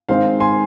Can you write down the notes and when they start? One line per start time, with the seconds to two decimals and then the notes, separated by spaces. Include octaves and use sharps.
0.09 D#3 G#3 C4 D#4 C5 F5
0.40 G#5 C6